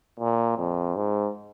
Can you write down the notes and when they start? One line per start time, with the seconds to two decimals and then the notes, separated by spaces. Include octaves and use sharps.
0.20 A#2
0.58 F2
0.96 G#2